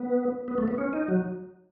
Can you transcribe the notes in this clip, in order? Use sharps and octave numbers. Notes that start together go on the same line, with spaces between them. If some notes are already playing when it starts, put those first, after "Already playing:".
Already playing: B3
B3
A3
B3
C#4
D#4
F#3